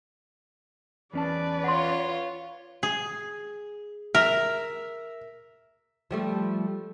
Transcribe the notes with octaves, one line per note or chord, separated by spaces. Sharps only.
E2 C#4 B4 D5 A5
F4 C#5 F#5 C6
G#4
A#4 E5
F3 G3 A3